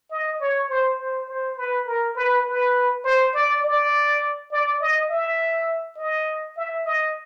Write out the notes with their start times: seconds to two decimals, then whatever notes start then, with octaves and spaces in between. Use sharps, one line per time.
0.11 D#5
0.40 C#5
0.70 C5
0.99 C5
1.28 C5
1.57 B4
1.87 A#4
2.16 B4
2.46 B4
3.04 C5
3.34 D5
3.63 D5
4.52 D5
4.81 D#5
5.10 E5
5.97 D#5
6.57 E5
6.86 D#5